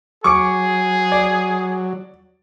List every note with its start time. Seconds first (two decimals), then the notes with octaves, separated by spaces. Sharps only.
0.24 F#3 G#4 C#6 D6 C#7
1.12 D5